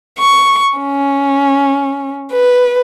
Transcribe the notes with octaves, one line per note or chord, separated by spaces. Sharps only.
C#6
C#4
B4